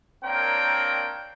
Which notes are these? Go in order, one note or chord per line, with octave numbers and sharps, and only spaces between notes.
A#3 C4 D4 A#4 C#5 G5